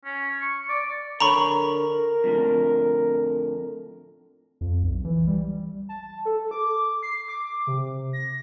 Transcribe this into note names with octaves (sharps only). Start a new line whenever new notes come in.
C#4
C#6
D5
D3 A#4 C#5 A#5 B5 C#6
F2 A2 D3
F2
B1
E3
G3
A5
A4
D6
C7
D6
C3
A#6